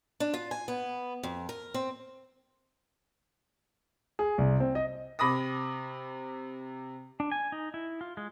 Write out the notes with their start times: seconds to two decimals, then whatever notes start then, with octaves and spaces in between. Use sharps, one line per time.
0.20 D4
0.34 F4
0.51 G#5
0.68 B3
1.23 F2
1.49 A#4
1.74 C4
4.19 G#4
4.38 C2
4.60 C4
4.75 D#5
5.19 C3 B5 D6 D#6 A#6
7.20 D4
7.32 G#5
7.52 D#4
7.74 E4
8.01 F4
8.17 G#3